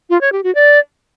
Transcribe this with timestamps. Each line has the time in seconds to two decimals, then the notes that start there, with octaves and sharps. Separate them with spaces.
0.10 F4
0.21 C#5
0.32 G4
0.44 F#4
0.55 D5